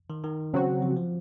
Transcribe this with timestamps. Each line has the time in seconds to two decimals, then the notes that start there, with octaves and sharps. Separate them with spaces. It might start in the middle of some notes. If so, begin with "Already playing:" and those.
0.10 D#3
0.24 D#3
0.53 C#3 F#3 C4 F#4
0.82 F3
0.97 F3